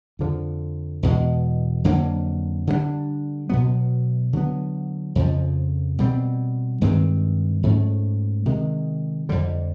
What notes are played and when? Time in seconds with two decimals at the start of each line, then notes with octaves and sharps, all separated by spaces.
0.19 F2 D3 F3
1.03 E2 B2 G#3
1.84 F2 D3 F#3 A#3
2.67 D3 G3 B3 D4
3.49 B2 F#3 B3
4.33 D3 F#3 B3
5.15 F2 C#3 F3
5.99 B2 G3 C4
6.81 G2 D#3 G#3 C4
7.63 G#2 F3 A3 C#4
8.46 C3 D#3 G#3
9.29 F2 D3 G3